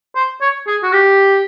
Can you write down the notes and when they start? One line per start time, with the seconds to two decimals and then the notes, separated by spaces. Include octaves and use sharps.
0.16 C5
0.41 C#5
0.68 G#4
0.83 F#4
0.93 G4